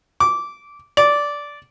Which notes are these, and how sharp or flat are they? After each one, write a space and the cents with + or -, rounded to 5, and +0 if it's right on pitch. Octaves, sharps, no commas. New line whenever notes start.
D6 -15
D5 -10